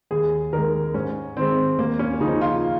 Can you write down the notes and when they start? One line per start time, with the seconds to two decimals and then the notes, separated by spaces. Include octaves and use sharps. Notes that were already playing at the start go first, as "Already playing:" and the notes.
0.11 D#2 G#4
0.53 D#3 G#3 A#4
0.94 G#2 C#4
1.36 D#3 G#3 C4
1.79 D#2 A#3
1.99 C#4
2.20 C#3 F3 D#4
2.41 F4